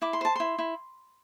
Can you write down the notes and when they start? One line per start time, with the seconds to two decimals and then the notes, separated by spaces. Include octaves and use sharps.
0.02 E4 D6
0.13 C6
0.21 C5 A5
0.36 E4 C6
0.58 E4